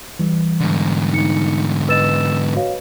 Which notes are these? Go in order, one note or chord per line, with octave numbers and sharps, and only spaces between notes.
E3 G3
G#2 D3
D#4 C#7
B4 D#5 E6 A6 E7
F#4 C#5 F5